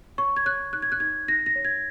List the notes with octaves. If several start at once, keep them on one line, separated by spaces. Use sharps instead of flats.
C#5 C#6
G#6
C#5 F#6
D#4 F#6
G#6
F#6
D#4 G#6
D#4 A#6
A#6
C#5
G#6